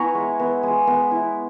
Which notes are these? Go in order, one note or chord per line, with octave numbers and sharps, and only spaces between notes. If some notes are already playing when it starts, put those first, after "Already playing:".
Already playing: B3 E4 G#5 A#5 C#6
G#3
B3
G#3
B3
E4